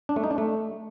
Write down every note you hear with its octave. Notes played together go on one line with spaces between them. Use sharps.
D4
A3
D#4
D4
A3